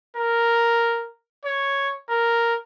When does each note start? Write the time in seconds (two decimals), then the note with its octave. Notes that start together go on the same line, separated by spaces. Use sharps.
0.17 A#4
1.45 C#5
2.09 A#4